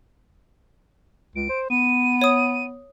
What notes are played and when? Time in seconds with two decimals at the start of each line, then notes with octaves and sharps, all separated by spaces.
1.35 C#2 D7
1.49 C5
1.70 B3 D#7
2.22 C#5 D#6